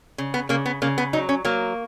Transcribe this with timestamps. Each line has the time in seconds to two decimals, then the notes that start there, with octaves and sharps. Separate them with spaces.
0.18 C#3
0.34 B3
0.49 C#3 A#3
0.66 B3
0.82 C#3 A#3
0.98 B3
1.13 F#3 D#4
1.29 C#4
1.45 F#3 A#3